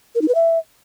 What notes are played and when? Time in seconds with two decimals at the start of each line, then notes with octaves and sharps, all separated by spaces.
0.15 A#4
0.22 D#4
0.28 B4
0.35 E5